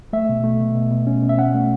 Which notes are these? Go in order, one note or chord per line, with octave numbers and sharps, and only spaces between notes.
A3 E5
B2
A3
B2
B2
B2
C#4
B2
E5
C#4 F#5
A3